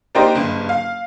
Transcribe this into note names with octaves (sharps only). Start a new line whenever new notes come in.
A#3 D4 D#4 G4 A#4 C5
F#1 G2
F5